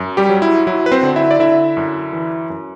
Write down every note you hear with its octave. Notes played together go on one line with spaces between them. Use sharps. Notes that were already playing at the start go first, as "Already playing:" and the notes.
Already playing: F#2
G3 G4
F#3
E4
F#3 E4
B4
C4 C5
D3
E4 E5
D5
D3 E4 E5
F#2
E3
F#2